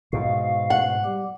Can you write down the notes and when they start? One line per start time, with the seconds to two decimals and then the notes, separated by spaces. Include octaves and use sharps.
0.13 G#2 B2 F#4 F5
0.70 F#5
1.05 G3 G4